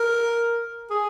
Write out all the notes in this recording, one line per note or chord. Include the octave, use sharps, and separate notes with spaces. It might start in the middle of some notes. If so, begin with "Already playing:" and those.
Already playing: A#4
G#4